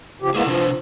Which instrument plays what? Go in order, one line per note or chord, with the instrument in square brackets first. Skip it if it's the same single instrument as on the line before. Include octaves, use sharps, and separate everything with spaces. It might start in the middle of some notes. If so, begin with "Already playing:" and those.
[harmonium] C#3 F3 G4
[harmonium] G#3 A#3 B3 [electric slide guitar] E4 G#4
[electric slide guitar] C3 D4 B4 [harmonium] F3